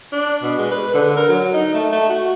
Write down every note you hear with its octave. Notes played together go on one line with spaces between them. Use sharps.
D4
B2
G#3
B4
D3
A#4
F#3
D#4
A3
A3
F#4